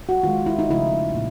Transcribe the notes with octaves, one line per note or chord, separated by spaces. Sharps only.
F#4
D#3 G#3 F4
E4
D#4
C#3 F3 A3 E4
A#2